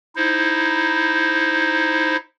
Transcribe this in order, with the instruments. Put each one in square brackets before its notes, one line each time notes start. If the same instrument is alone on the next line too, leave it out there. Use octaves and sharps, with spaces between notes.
[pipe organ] D#4 E4 C5